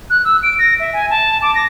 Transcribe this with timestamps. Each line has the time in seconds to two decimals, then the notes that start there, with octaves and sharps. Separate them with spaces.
0.10 F#6
0.25 E6
0.43 D7
0.59 A#6
0.80 E5
0.93 G#5
1.10 A5
1.42 D6
1.55 A#6